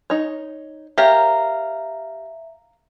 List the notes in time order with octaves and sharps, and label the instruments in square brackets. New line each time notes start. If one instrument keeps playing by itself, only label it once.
[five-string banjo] D#4 C#5
[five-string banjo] G4 A#4 C#5 [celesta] E5 [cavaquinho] F5 A#5